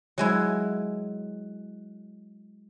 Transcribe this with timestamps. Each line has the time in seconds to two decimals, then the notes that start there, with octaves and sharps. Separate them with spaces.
0.18 F#3 G#3 E4